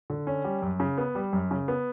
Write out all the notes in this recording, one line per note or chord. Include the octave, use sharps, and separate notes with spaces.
D3
C#4
G3
F#2
C#3
B3
G3
F#2
C#3
B3